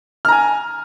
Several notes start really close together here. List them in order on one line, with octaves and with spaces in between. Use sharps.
F6 A#5 G#5